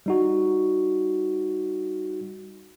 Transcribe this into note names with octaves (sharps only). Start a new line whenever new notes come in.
G3 D#4 F#4